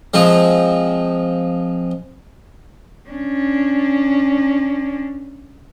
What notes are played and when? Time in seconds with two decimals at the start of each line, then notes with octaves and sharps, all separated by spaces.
0.14 F3 G#3 C4
3.10 C#4 D4